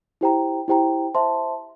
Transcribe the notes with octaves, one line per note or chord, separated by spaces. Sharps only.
E4 G4 C5 G5 A#5
E4 G4 C5 G5 A#5
C5 E5 A5 C6